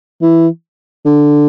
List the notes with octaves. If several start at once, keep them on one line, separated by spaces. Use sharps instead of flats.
E3
D3